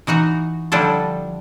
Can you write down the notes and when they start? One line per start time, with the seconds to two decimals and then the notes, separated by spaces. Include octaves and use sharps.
0.07 E3 D#4 F#4 A#5
0.72 D3 F3 G3 D4 E4 A4